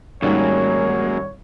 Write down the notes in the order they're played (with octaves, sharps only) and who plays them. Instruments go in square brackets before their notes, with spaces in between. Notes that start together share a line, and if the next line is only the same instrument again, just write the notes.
[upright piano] G#1 D#3 G3 [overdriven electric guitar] F#2 [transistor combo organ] G#3 A#3 [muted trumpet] C#5